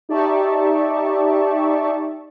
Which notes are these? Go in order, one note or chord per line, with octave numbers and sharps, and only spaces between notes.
D#4 G4 D5 E5 A5 C#6